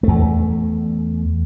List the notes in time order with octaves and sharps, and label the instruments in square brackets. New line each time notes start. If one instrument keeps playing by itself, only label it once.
[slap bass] E2 A3